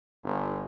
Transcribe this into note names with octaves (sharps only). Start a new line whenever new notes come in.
G1